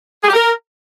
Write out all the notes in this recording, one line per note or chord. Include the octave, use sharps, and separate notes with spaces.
G#4
G4
A#4